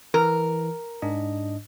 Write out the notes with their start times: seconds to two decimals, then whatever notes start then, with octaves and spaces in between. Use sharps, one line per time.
0.14 E3 A#4
1.02 G#2 D4 D#5